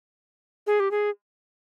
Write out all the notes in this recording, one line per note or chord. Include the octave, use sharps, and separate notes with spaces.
G#4
G4
G#4